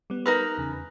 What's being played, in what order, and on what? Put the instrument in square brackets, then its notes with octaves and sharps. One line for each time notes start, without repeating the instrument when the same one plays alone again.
[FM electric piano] G3 B3
[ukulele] D#4 A#4 B4
[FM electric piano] E2 C#3